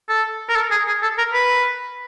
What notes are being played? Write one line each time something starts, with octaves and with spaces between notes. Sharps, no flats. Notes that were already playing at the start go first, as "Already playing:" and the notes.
A4
A#4
A4
G#4
G#4
A4
A#4
B4